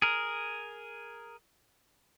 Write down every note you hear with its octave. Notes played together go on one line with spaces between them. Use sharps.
G#4 A#4